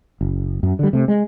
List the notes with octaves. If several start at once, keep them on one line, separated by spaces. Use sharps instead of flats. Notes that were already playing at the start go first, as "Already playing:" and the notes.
F#1
F#2
D3 G3
C3 A3
G#3